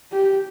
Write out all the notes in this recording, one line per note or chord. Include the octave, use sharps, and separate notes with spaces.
G4